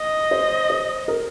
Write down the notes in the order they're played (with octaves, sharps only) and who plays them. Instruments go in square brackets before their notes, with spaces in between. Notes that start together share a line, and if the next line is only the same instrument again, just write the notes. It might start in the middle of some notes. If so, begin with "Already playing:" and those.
Already playing: [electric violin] D#5
[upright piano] C5
C5
A#4